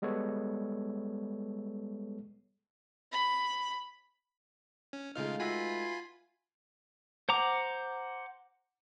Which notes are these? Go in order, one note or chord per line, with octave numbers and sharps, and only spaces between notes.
G3 G#3 B3 A4 C#5
B5
C#4
C#3 G#3 A3 D#4 F4 F5 F6
F4 F#4 B4 E5 G#5 B5
C5 F#5 A#5 D6